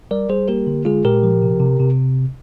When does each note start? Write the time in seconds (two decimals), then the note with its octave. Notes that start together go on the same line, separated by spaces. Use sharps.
0.11 G3 A#4 D5
0.29 G3 G#4 C5
0.48 A#3 G4 A#4
0.67 D3
0.85 G#3 F4 G#4
1.04 A#2 G4 A#4
1.23 F3
1.42 C3
1.60 C3
1.79 C3